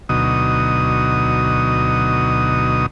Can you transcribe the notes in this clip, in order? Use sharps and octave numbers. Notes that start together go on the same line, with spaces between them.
D2 B2 F#3 D#4 D#6